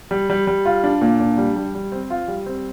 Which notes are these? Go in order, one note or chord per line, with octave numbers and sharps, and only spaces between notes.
G3
G3
G3
F4
D4
A#2
D4
G3
G3
G3
C4
F4
G3
C4